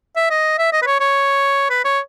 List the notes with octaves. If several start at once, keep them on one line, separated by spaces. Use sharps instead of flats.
E5
D#5
E5
D#5
B4
C#5
C#5
B4
C#5